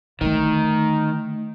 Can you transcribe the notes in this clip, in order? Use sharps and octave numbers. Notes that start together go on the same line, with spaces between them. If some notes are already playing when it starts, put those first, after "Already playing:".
D3 D#3 A3